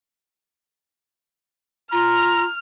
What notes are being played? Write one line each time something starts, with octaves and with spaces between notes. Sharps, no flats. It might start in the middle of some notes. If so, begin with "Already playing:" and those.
F4 A#5 F6